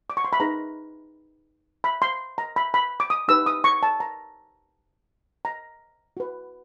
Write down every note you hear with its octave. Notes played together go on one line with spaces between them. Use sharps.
D6
C#6
C6
B5
D#4 G#4 B4 A#5
B5
C6
A#5
B5
B5
D6
D#6
D#4 G4 B4 E6
D#6
C#6
A5
A#5
A#5
F#4 B4